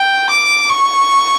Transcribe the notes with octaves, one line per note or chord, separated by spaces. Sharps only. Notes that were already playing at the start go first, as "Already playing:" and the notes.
Already playing: G5
D6
C#6